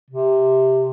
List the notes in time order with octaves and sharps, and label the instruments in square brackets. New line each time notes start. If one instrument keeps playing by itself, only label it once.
[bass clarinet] C3